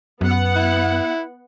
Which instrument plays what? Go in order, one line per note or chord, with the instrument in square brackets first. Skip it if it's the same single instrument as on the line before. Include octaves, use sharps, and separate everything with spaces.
[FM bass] F#2 [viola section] B3 F#5
[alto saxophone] E4